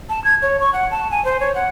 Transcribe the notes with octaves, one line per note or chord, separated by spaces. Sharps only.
A5
G#6
C#5
C#6
F#5
A5
G#5
C5
C#5
F#5